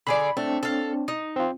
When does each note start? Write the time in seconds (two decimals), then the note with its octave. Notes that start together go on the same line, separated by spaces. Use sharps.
0.07 D3 G#4 D5 B5
0.37 A3 C4 D4
0.63 A4 F5
1.08 D#4
1.36 C4 F4